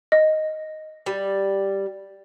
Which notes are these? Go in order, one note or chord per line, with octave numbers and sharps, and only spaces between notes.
D#5
G3